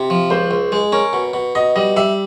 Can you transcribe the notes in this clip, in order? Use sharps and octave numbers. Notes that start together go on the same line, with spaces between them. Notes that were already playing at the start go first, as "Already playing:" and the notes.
Already playing: C3
F3
C#2 C5
C#2
G#3
C#4 A#4
B2
B2
B2 D#5
G3 D#5
G3 E5